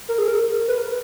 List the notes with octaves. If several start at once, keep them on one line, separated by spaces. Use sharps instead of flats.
A#4
G#4
A#4
B4
A#4